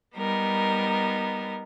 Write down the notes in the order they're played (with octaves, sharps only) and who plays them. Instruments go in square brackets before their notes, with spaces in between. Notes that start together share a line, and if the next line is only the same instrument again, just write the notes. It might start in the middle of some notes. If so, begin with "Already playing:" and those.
[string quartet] G3 B3 D#4 A#4